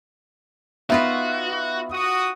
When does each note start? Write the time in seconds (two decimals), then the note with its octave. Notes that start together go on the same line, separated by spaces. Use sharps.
0.90 B3 D#4 F4 F#4 B4 E5
1.91 F#4 D#6